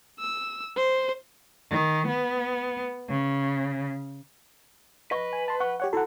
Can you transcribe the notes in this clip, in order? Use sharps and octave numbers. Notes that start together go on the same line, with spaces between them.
E6
C5
D#3
B3
C#3
B4 D#5 E5 C#6
G#5
A5 C6
F#5 C#6
G4 C#5 F#5
E4 F#4 A4 F#5